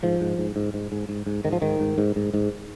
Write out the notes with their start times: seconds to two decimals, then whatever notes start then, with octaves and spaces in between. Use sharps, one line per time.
0.03 G#2 F3
0.21 G#2
0.38 G#2
0.56 G#2
0.74 G#2
0.92 G#2
1.09 G#2
1.26 G#2
1.45 G#2 D#3
1.53 F3
1.62 G#2 D#3
1.80 G#2
1.98 G#2
2.16 G#2
2.34 G#2